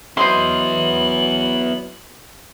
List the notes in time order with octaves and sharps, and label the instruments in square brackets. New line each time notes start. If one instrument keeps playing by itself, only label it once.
[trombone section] F#3 B4 [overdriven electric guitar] B3 E4 [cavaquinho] C5 D#5 C6 [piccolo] F#7